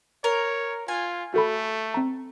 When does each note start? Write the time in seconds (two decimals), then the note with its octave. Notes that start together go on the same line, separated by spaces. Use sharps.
0.24 A#4 C#5
0.88 F4 G#5
1.34 A3 F#4 A4 B5
1.94 C4 A#5